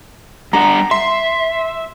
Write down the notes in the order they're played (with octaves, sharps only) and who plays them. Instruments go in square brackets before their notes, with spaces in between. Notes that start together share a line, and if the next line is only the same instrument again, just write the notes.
[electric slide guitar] G3 D4 F#5 [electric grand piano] A#5
[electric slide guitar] E5 [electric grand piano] C6